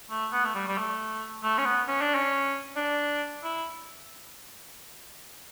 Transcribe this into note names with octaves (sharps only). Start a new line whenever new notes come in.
A3
B3
A3
G3
G3
A3
A3
C#4
B3
C#4
D4
C#4
D4
E4